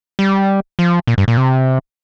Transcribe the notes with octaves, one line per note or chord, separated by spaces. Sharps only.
G3
F3
A#2
G2
A#2
C3